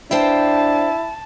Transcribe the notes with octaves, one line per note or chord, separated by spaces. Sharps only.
D4 E4 C5 F5 G5 A5